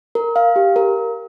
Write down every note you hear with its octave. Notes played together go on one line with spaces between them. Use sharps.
A#4
F5
G4
A#4